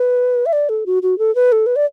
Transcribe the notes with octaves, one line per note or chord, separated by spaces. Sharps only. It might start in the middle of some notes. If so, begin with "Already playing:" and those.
Already playing: B4
E5
D5
A4
F#4
F#4
A4
B4
A4
B4
D5